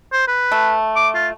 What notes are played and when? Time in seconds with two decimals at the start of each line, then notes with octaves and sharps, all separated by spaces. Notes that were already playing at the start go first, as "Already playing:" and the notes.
0.13 C5
0.28 B4
0.52 A3
0.96 D6
1.15 F4